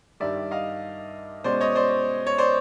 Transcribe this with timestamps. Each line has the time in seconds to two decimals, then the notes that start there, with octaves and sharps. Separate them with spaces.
0.20 G2 D#3 G3 D5 E5
0.51 D#5 F5
1.44 B2 G#3 C#4 C5 D5
1.60 C#5 D#5
1.76 C5 D5
2.27 C#5
2.38 C5 D5